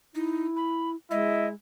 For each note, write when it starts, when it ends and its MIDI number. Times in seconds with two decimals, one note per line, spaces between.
0.15 0.47 63
0.15 0.95 64
0.56 0.90 83
1.11 1.54 56
1.11 1.49 64
1.11 1.48 75